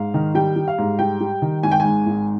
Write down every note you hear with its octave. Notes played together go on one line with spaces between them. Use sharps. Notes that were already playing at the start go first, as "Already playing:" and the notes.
Already playing: G#2 F5
D#3
G3 G5
G3
F5
G#2
G3 G5
G3
D#3
G#1 G#5
G5
G#2 G#5
G#1